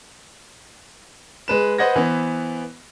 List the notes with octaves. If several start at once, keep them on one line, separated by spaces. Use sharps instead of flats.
G#3 B4 E7
B4 C5 D#5 F#5 G#6 A#6
E3 B3 C5